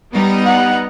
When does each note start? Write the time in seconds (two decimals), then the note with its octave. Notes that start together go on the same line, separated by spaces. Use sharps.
0.12 G3 B3 D#4
0.46 F#5